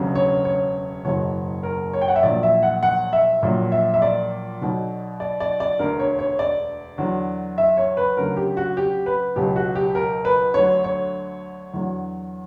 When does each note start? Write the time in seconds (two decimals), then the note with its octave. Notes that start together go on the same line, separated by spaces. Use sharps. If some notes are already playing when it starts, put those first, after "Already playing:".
Already playing: E1 D2 C#3 F#3
0.15 C#5
0.45 C#5
1.04 F#1 E2 B2 F#3 C#5
1.63 A#4
1.93 C#5
2.01 G5
2.08 F#5
2.16 E5
2.23 A#1 A#2 F#3 D5
2.43 E5
2.63 F#5
2.83 F#5
3.13 E5
3.42 A#1 A#2 F#3
3.72 E5
3.94 E5
4.02 D5
4.61 B1 B2 F#3
5.20 D5
5.40 D5
5.60 D5
5.79 E1 D2 D3 A#4
5.99 C#5
6.19 C#5
6.39 D5
6.98 E2 D3 F#3
7.58 E5
7.77 C#5
7.97 B4
8.17 D2 C#3 F#3 A#4
8.37 G4
8.57 F#4
8.77 G4
9.06 B4
9.36 C#2 B2 F#3 G4
9.56 F#4
9.75 G4
9.95 A#4
10.25 B4
10.54 D2 D3 F#3 C#5
10.84 C#5
11.74 E2 D3 F#3